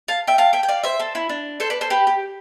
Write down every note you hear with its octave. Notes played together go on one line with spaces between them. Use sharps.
F5 A5
E5 G5
F5 A5
E5 G5
G5
D5 F5
C5 E5
A4 C5
E4
D4
A4 C5
B4 D5
A4 C5
G4 B4
G4